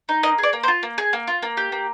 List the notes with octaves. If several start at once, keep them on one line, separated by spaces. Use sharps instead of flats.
D#4
A#3 D#5
G#4 D5
A#3
C5
F4
A#3
G#4
A#3
F4
A#3
G4
A#3